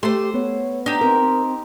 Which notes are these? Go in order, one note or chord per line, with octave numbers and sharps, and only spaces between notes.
A3 G4 C5 C6
B3 C#5
D4 D#4 G4
C4 A#4